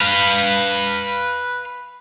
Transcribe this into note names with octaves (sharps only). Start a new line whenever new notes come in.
B4 F5